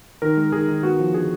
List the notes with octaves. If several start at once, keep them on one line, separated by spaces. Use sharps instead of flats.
D#3 A#4
G#3
D#3 G#4
D#3
B3 F#4
F3
D3 G#4